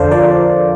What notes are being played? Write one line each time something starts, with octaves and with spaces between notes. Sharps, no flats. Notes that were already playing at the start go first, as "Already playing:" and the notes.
Already playing: F2 D3 A4 C5 D5 F5
F3 A#4 D5